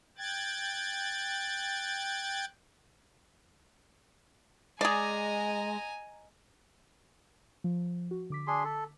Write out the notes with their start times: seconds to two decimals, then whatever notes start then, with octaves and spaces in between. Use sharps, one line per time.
0.18 G5 F#6 G#6 A6
4.81 G#3 G#4 D5 D#5 G#5 A#5
7.64 F3
8.11 F#4
8.30 D3 D6 B6
8.47 D4 G#4 C6
8.64 A4